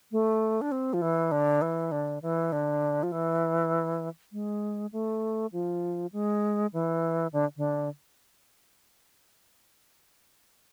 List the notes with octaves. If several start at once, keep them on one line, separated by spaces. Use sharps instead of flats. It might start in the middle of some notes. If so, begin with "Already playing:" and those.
A3
D4
C4
F3
E3
D3
E3
D3
E3
D3
F3
E3
G#3
A3
F3
G#3
E3
D3
D3